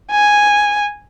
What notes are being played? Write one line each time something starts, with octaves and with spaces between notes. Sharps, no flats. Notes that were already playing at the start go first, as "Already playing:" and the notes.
G#5